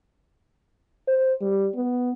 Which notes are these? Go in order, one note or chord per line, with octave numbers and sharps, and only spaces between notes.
C5
G3
B3